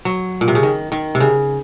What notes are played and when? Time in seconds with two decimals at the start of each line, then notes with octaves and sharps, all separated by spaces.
0.05 F#3
0.41 A#2
0.48 C3
0.55 C#3
0.63 D#3
0.92 D#3
1.15 C3
1.20 C#3